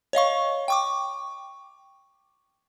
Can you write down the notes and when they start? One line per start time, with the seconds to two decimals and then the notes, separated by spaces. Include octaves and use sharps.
0.13 C#5 D#5 F5 C#6
0.68 G5 C#6 D6